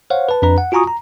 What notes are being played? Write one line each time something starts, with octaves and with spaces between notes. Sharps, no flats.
C5 C#5 F5 F#5
B4 A5
F2 D4 B4 A#5
F#5
F4 F#4 G#5 A#5 C#6 D#6
A#5